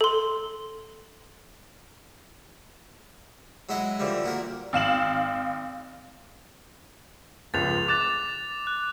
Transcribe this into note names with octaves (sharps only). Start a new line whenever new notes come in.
A4 C6
F#3 G#3 E4 F#4 D#5
D3 E3 F3 G3
A#2 F#4 A#4
G#1 F5 E7 F#7
G1 C#2 F3 A6 F7
D6 F#6 A6 E7
F#6